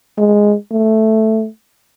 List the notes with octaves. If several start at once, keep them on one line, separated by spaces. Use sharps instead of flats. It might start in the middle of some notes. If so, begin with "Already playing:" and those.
G#3
A3